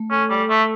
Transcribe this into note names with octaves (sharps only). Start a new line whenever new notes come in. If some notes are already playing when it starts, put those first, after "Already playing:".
Already playing: A3
C#4 A4
G3
A4
A3